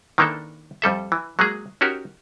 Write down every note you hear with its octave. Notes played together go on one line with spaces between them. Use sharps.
D#3 E3 A#3 D4 A4
F2 G3 A4 E5
E3
F#3 G#3 A#3 G#4
C#4 D#4 F#4 G4 A#4